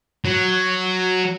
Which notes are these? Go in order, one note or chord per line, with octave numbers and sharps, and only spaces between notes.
F#3